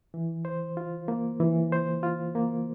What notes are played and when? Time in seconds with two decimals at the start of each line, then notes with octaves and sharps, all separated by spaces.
0.14 E3
0.45 C5
0.77 F4
1.08 A#3
1.40 E3
1.72 C5
2.03 F4
2.35 A#3